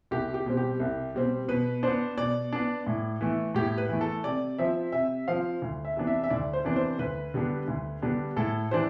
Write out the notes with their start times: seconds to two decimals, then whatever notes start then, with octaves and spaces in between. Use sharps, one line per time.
0.11 C2 G4
0.34 G4
0.46 B2 G3 C4
0.57 G4
0.80 C2
1.15 B2 G3 C4
1.48 B2 B4
1.83 B3 D4 C5
2.17 B2 D5
2.53 B3 D4
2.87 A2
3.21 E3 A3
3.55 A2 G4
3.78 B4
3.89 E3 A3
4.01 A4
4.24 C3 D5
4.58 F3 C4 E5
4.92 C3 E5
5.28 F3 C4 F5
5.62 D2
5.85 E5
5.96 C3 E3 B3 D4
6.07 E5
6.24 E5
6.30 D2 D5
6.53 C5
6.65 C3 E3 B3 D4
6.76 C5
6.99 D2 B4
7.34 D3 G3 B3 D4
7.68 D2
8.02 D3 G3 B3 D4
8.37 A2 A4
8.71 E3 G3 D4 C5